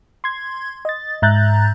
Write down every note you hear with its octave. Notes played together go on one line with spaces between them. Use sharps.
C6 G#6
D#5 A6
G#2 E5 A#5 F#6 G6 A6